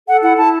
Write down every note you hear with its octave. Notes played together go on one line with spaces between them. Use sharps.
A4 F#5
E4 F#5
E4 A5